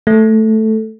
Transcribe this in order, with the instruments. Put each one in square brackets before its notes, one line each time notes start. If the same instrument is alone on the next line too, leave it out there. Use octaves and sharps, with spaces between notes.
[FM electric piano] A3